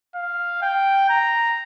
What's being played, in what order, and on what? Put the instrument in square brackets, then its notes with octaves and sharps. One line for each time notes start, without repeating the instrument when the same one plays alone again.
[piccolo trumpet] F5
G5
A#5